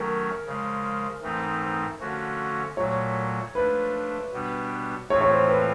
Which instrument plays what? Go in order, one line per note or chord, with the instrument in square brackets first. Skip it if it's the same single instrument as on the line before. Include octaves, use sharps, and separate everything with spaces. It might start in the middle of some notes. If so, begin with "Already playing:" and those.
Already playing: [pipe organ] D#3 F#3 A3 C#4 [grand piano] A#4
[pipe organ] C#3 F3 G#3
G#2 E3 A3 C4 D#4
D3 F3 A3 C#4 F#4
[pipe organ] A#2 F#3 A3 [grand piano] C#5
[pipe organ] F3 A3 D4 [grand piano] B4
[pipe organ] B2 G3 B3 D4
[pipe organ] A2 E3 A3 C4 F4 [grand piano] C#5
[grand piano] C#5
C5
B4